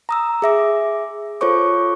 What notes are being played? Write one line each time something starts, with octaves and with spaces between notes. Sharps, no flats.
A#5 D#6 E6
G#4 E5 D6
F4 A4 C5 C#5 C#6 D6